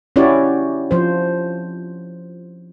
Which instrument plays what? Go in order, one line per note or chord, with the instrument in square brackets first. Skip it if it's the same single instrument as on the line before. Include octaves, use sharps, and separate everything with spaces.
[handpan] C#4 E4 F#4 G4 C#5 D5
F3 C5